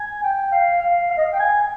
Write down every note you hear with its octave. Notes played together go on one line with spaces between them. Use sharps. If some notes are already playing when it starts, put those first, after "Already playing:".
Already playing: G#5
G5
F5
F5
F5
D#5
F5
G5
G#5
G#5